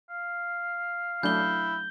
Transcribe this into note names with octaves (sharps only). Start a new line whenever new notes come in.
F5
F#3 A3 D4 E4 G6 G7